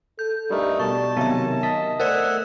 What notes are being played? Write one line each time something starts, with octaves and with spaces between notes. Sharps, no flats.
A4 G6
G2 G3 A3 D#4 A#4
B2 G3 A5 C#6
C3 D#3 F#3 B3 E5 G#5
D#5 D#6 B6
A3 A#4 C5 D5 F#5 E6